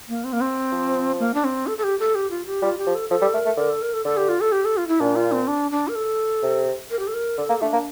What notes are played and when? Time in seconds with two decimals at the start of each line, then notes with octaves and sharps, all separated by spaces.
0.09 A#3
0.24 C4
0.33 A#3
0.41 C4
0.72 F3
1.19 A#3
1.34 D4
1.44 C4
1.67 A4
1.78 A4
1.83 G4
2.00 A4
2.15 G4
2.31 F4
2.46 G4
2.62 G3 F4
2.78 G4
2.86 F3
2.95 A4
3.10 F3 A4
3.21 G3
3.34 A3 A#4
3.46 A3
3.57 D3 A#4
3.70 A4
3.82 A#4
3.93 A4
4.05 D3 A4
4.17 G4
4.29 F4
4.41 A4
4.52 G4
4.65 A4
4.77 F4
4.88 E4
5.00 A#2 D4
5.16 F4
5.32 C4
5.48 D4
5.71 D4
5.88 A#4
5.95 A4
6.43 C3
6.91 A#4
6.99 G4
7.07 A4
7.14 A#4
7.38 D3 A4
7.49 A#3
7.62 A3 D4
7.73 A#3